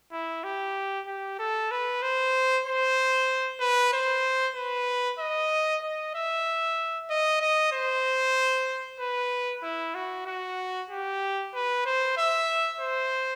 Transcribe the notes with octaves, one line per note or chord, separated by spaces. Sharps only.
E4
G4
G4
A4
B4
C5
C5
B4
C5
B4
D#5
D#5
E5
D#5
D#5
C5
B4
E4
F#4
F#4
G4
B4
C5
E5
C5